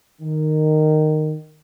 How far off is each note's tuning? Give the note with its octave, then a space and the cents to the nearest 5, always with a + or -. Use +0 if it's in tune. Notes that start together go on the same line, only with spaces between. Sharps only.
D#3 -15